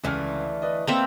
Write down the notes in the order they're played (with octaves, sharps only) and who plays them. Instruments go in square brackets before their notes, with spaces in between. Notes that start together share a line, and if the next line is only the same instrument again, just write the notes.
[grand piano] C#2 F6 [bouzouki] D3 E3 A3
[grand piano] B4 D5 D#5
[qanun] A#3 C4 E5 [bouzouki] A4